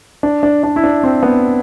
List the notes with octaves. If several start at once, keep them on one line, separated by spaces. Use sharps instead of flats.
D4
D4
D4
E4
D4
C4
B3